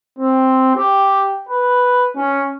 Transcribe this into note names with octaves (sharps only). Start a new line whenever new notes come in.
C4
G4
B4
C#4